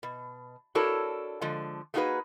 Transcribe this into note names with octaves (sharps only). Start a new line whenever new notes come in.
B2
D4 E4 F#4 A4 A#4 C#5
D3 F3 G#3
A3 A#3 D#4 F#4 G#4 B4